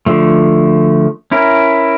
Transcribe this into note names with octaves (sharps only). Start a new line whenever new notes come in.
D3 F3 A3
C#4 E4 A#4